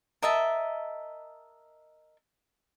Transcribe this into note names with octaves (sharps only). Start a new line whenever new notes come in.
A#4 D#5 E5 A5